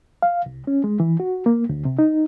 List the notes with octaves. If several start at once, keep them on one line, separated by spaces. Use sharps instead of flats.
F5
C2
C#4
G#3
E3
F#4
A#3
D2
C3
D#4